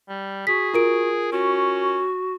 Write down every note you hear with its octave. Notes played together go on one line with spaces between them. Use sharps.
G3
F#4 G#4 B6
F4 A#4 D7
C#4 F#4